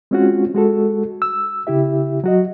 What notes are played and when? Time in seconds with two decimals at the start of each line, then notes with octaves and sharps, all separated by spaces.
0.11 G#3 C4 C#4 F4 F#4
0.54 G#3 F#4 A4
1.22 E6
1.67 C#3 E4 G4 E5
2.24 F#3 F#4 D#5